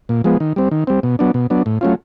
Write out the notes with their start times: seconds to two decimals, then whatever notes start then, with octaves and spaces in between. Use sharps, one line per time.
0.09 A#2
0.24 F3 G#3 B3
0.40 D#3
0.56 G3 C4
0.71 D#3
0.87 G3 C4
1.03 B2
1.19 F#3 B3 D4
1.34 B2
1.50 F#3 B3 D4
1.66 A2
1.81 F#3 A3 C#4 F4